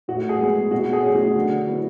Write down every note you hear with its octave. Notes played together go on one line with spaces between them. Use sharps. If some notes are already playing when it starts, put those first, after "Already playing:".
A2 F#4
G#4
G#3 B3
B2 F#4
G#4
F#3 A3 C#4
F#4
D3
F#3 B3 E4